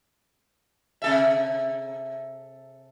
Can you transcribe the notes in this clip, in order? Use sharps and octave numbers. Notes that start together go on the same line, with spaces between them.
C3 A4 E5